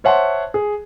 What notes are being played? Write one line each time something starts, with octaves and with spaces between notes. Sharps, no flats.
C5 C#5 E5 F#5 A5 C6
G#4